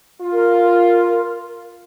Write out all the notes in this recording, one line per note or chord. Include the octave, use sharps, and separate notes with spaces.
F4
A#4
A#4